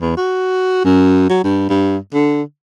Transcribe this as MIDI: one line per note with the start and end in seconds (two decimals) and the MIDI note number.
0.01 0.14 40
0.17 0.81 66
0.84 1.27 42
1.29 1.44 54
1.44 1.69 43
1.69 1.97 43
2.14 2.42 50